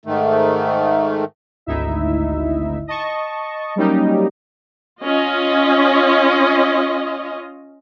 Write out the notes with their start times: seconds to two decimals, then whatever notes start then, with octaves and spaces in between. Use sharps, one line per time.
0.06 G#2 D#3 A3
1.66 G#1 D2 D#4 E4 E5
2.87 D#5 A5 C#6
3.76 F#3 G3 A#3 C#4 D#4 G4
5.01 C#4 F4 D#5